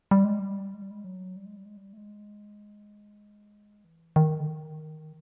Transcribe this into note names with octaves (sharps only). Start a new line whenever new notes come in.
G3
G#3
G3
G#3
G3
G#3
F#3
G3
G#3
G3
G#3
G3
A3
G#3
E3
D#3
D3
D#3